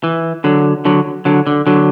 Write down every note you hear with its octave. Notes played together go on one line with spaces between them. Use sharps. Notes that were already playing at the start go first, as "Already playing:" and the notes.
E3
D3 F#3
D3 F#3
D3 F#3
D3
D3 F#3